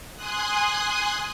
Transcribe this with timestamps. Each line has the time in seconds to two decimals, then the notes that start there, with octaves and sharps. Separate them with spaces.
0.15 G#5 C6 D#6 F#6